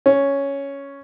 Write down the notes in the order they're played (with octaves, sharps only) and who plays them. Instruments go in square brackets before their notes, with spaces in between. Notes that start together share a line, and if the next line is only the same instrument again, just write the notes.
[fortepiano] C#4